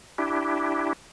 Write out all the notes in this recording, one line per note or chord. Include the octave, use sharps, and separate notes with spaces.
D4 E4 G4